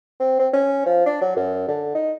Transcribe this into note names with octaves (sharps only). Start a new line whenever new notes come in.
C4
C4
C#4
F3
D4
F#3
F#2
D3
D#4